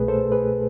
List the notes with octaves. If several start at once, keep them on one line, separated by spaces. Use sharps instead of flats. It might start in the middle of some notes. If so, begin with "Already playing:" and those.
Already playing: C2 B2 A3 G#4 B4
A4 C5
G#4 B4